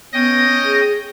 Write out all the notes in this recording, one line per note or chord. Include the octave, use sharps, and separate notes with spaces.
B3 C#4 D#5 G5 D#6
G#4